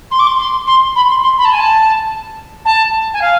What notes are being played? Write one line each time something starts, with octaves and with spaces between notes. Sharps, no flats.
C6
D6
C6
C6
C6
B5
C6
C6
B5
A5
G#5
A5
A5
G#5
F5